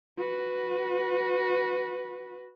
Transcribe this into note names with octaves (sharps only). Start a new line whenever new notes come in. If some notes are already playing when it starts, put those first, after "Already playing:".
F#4 B4